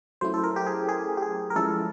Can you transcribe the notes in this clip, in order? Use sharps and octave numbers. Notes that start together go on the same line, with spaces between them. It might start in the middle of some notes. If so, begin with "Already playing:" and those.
F#3 A3 C#4 E4 C5
A4
A#4
G4
G#4
G#4
G4
G#4
A#4
F3 G#3 C#4 E4 A4